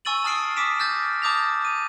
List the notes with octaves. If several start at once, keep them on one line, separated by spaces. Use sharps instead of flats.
G#5 C#6 E6 A6 D#7 F#7
A5 D#6 F6 C7 D7
D6 D#6 B6 D7 E7
F6 G6 A6 A#6
A5 D6 D#6 G6 A#6 F7
D#7